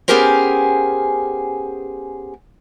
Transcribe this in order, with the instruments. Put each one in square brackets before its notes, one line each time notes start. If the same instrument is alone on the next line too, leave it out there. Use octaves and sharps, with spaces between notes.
[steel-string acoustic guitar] B3 C#4 G4 G#4 A#4 C5